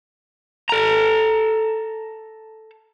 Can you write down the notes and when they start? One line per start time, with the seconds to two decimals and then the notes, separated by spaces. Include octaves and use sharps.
0.69 A4 A#5